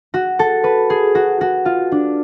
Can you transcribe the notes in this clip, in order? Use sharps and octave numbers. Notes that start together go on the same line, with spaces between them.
F#4
A4
B4
G#4
F#4
F#4
F4
D4